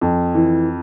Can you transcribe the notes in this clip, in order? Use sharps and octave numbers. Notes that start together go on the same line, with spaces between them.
F2
E3